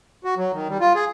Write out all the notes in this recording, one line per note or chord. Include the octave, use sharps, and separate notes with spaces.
F#4
F#3
D#3
G3
F4
G#4